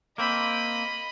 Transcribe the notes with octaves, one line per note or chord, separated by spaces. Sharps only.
A#3 C4 D#5 B5